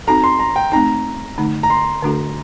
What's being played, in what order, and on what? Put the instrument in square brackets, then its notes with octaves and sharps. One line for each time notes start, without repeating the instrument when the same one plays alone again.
[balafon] C4 D#4 F#4 A4 [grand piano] A#5
[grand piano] C6
A#5
G5
[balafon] A3 C4 D#4 [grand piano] A#5
[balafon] D3 A3 D#4
[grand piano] A#5
C6
[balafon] D3 A3 D4 F#4 A4